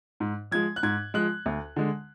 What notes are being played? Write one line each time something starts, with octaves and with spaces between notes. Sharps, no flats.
G#2
F3 G#3 G#6
F#6
G#2 G#6
F3 G#3 F#6
D2
D3 G#3